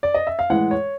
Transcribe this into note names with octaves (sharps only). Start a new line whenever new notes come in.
D5
D#5
E5
F5
A2 E3 G#3 F#5
C#5